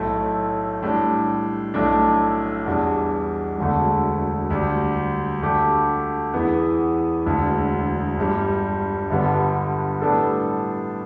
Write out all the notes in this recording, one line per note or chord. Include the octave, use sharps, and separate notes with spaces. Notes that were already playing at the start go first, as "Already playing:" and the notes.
Already playing: B1 A2 A3
A2 G3 D4
B1 A2 A3 D4
E2 B2 G3 D4
E1 D2 D3 A3
D2 D3 G3 D4 G4
D2 D3 A3 D4 G4
E2 E3 B3
E1 D2 D3
G1 G2 G3
G1 G2 D3 G3 B3
A2 G3 B3 D4 A4